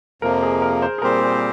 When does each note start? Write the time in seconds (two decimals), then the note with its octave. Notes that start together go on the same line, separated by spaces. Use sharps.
0.22 F2 C3 F3 A#3 A#4
0.43 G#4
0.62 A#4
0.82 C5
0.98 G#4
1.02 A#2 G3 C4 G4 A#4 C5
1.22 G#4